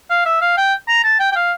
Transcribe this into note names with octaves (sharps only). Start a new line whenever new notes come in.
F5
E5
F5
G5
A#5
A5
G5
G5
F5